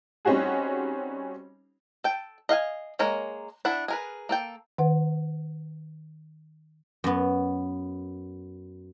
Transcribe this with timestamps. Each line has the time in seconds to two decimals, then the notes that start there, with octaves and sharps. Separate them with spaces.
0.25 G3 C4 C#4 D#4 F#4 G#4
2.04 A4 G5
2.49 D#5 F5 F#5 G#5
2.99 G#3 A#3 A#4 C#5
3.65 D4 E4 E5 F#5
3.88 G#4 A#4 B4
4.29 A#3 A4 G5
4.78 D#3 B4 F#5
7.04 F#2 B3